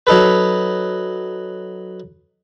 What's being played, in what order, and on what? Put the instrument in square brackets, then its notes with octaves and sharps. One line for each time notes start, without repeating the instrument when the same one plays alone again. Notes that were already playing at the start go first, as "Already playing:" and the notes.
[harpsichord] F#3 D#4 A4 B4